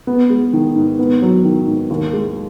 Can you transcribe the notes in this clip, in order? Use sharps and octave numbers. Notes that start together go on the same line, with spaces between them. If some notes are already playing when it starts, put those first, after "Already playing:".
B3
G#3
D#3
G#2
B3
F#3
D#3
G#2
D#2
G#3